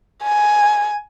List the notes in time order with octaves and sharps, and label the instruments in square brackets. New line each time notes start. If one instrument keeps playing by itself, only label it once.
[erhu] G#5